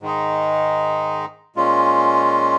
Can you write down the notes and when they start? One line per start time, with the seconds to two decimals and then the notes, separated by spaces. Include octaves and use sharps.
0.02 G#2 D#3 G#3 D#4
1.56 A#2 G#3 C#4 F4